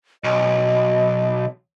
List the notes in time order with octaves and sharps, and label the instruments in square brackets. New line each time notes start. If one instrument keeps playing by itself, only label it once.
[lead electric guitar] B1 [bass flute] D#5